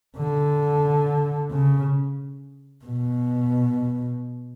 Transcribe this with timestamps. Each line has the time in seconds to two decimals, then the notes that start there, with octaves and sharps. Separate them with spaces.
0.17 D3
1.51 C#3
2.85 B2